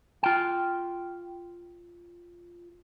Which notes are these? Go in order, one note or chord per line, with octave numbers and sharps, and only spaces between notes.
F4 G5